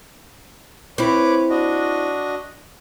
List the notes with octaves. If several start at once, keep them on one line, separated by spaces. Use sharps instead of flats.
C4 E4 B4 C#5 D6
D4 F#4 D#5